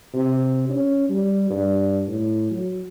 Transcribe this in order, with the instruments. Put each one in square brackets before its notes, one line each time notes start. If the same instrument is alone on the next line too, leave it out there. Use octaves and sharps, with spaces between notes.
[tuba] C3
C#4
G3
G2
A2
F#3